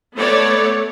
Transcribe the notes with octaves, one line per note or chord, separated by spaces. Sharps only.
A3 B3 C#5 D5